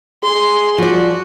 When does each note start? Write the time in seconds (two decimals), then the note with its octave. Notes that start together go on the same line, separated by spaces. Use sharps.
0.24 G#4 C6
0.78 F3 F#4 D5